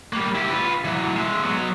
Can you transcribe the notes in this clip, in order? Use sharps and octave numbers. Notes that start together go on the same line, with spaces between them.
G3 A#3
E4 G4
F4 B4
E3 F#3
G#3 E5
F#3 B3